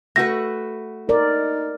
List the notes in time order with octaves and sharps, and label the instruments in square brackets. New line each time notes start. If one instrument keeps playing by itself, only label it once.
[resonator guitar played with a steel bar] A3 F#4 B4 [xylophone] A#6
[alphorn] D#4 [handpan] A#4 D5